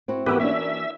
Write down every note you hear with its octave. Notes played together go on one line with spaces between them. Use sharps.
C4 E4 F#4
E3 B3 F#4 G4 A#4 B4 G5 E6
A#3 C#4 D4 E5